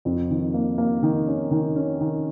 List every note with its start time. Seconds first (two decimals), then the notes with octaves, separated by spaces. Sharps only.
0.05 F2
0.30 D#3
0.54 A#3
0.78 A#3
1.03 D#3
1.27 C#4
1.51 D#3
1.76 C#4
2.01 D#3